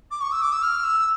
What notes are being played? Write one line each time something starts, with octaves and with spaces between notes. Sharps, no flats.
D6
C#6
E6
D6
E6
F6
E6